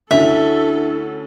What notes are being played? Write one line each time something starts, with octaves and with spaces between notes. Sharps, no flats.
D2 C#4 D4 E4 A4 E5 F7